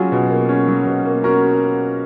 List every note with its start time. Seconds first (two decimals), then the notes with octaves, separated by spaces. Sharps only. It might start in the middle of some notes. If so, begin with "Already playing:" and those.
Already playing: F#3 C#4 F4 F#4 G#4
0.12 B2
0.30 A#3
0.49 C#4
0.68 F#3
0.86 B2
1.05 A#3
1.24 C#4 F#4 A#4